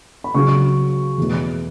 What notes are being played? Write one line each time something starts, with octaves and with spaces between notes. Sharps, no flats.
B5
C#2 C#3 F#3 C#6
E2 B2 A3